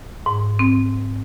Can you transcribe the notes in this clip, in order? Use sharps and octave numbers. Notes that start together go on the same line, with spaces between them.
G#2
C4